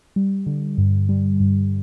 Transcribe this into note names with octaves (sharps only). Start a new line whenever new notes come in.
G3
D3
G2
G3
G2